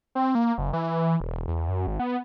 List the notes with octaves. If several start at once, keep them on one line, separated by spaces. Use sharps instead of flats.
C4
A#3
F#1
E3
E1
E2
F#2
G#1
B3